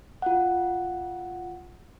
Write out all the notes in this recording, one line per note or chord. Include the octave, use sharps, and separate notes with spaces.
F4 F#5